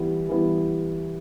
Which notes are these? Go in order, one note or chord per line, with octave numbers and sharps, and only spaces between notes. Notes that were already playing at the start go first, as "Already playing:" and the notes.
Already playing: E3 G3 B3 E4
E3 G3 B3 E4